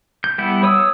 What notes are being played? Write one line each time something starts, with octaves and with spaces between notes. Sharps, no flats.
G6
G3 B3 E4 G6
C#5 D#6 E6